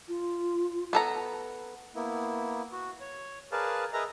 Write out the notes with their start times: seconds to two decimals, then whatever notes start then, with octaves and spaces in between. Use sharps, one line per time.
0.08 F4
0.93 B3 A4 A#5
1.95 A#3 B3 E4
2.72 F#4
3.01 C#5
3.52 G#4 A#4 B4 D5 F5 A5
3.93 G#4 A#4 B4 D#5 E5 A#5